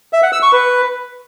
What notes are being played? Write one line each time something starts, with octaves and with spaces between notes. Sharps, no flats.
E5
F#5
E6
C#6
B4